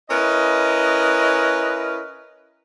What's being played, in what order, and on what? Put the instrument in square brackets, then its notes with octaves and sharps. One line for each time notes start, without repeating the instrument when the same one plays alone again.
[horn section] C#4 E4 A#4 B4 D#5